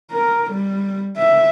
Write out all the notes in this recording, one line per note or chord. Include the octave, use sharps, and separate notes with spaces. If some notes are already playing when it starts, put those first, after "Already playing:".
A#4
G3
E5